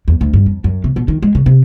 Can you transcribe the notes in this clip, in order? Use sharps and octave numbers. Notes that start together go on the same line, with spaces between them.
E2
D2
G2
F2
F#2
C3
B2
D#3
G#3
C#3
C3